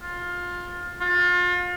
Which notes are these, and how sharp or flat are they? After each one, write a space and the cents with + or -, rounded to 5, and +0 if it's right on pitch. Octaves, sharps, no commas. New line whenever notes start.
F4 +20
F4 +35